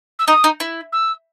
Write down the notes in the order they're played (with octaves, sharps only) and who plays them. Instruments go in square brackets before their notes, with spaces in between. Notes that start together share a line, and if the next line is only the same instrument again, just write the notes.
[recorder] E6
[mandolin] D#4 [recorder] D#6
[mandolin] D#4
E4
[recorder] E6